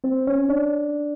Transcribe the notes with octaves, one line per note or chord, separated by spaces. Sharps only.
C4 C5
C#4 C#5
D4 D5